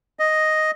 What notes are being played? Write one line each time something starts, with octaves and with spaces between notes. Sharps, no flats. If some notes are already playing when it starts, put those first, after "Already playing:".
D#5